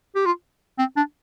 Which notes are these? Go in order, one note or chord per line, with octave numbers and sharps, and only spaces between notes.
G4
F4
C4
D4